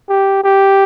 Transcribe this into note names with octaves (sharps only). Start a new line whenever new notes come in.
G4
G4